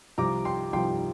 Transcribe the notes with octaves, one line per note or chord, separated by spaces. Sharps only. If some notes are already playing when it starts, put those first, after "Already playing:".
C2 C3 F3 A#5 D6
G5 C6
C2 C3 F3 G5 C6